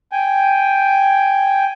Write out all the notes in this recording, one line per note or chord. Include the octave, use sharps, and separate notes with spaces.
G5 G#5